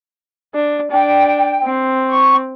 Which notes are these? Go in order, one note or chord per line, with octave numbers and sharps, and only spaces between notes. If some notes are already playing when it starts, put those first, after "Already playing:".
D4
D4 G5
C4
C#6